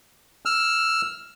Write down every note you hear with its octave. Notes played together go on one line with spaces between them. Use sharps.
E6 F6